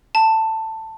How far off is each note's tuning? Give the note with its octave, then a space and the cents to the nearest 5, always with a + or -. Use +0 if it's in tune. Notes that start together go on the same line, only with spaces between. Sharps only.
A5 +15